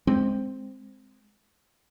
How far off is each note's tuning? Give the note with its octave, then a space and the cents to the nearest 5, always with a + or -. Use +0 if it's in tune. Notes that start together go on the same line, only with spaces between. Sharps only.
G#3 +0 C4 +0